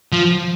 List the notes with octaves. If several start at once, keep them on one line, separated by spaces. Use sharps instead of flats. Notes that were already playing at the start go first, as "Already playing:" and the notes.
F3